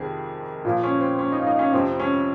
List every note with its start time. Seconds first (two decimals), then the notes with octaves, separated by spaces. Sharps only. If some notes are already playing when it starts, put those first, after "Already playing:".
Already playing: F2 C3 D#3 G#4
0.65 A#2 F3 F4
0.83 C#4
1.01 C4
1.19 C#4
1.32 D#4
1.40 F4
1.46 D#4
1.59 C#4
1.73 F2 C3 F3 C4
2.00 C#4